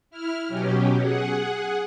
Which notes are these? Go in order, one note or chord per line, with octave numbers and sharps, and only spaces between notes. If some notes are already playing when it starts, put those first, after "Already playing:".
E4 F6
B2 F#3 C#4 G4
G#4 F#5